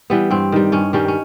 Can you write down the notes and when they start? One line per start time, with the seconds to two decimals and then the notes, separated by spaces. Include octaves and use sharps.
0.10 E3 G3 B3
0.30 G2 C4
0.52 D#3 G3
0.72 G2 C#4
0.93 D#3 G3 C#4
1.08 C#4